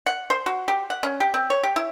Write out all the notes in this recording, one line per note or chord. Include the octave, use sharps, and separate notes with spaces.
F#5
C5
F#4
G4
F#5
C#4
G4
C4
C#5
G4
E4